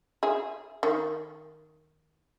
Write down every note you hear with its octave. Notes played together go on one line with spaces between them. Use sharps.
G#4 E5
D#3